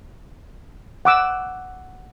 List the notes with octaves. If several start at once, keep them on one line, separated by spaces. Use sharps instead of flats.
F#5 D6 E6